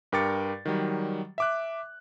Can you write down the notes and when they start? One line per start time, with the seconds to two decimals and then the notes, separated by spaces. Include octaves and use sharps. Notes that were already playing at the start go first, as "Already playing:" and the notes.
0.12 G2 A#4 G5 D6 A6 C#7
0.66 D#3 F#3 G3
1.38 E5 D6 F#6